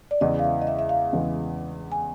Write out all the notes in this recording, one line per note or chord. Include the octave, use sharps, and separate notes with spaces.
D5
E2 C#3 E3 G#3 D#5
F5
E5
D#5
E5
E5
F5
E2 C#3 E3 G#3
G#5